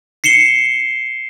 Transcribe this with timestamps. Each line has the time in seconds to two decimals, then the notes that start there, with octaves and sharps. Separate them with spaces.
0.24 C7 C#7 E7 G7